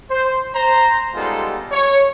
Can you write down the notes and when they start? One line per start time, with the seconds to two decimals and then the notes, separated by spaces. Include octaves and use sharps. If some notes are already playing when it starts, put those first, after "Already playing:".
0.10 C5
0.55 C5 A#5
1.15 G3 G#3 B3 D#4 F4 A4
1.72 C#5